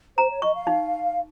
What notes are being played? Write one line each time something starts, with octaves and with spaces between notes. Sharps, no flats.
C5 A#5
C#5
D#5 C#6
F5
D#4